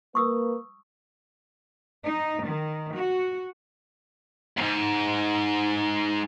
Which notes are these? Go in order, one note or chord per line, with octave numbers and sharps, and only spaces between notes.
A#3 B4 C#6 D#6 E6
D#4
D#3
F#4
D#2 G#2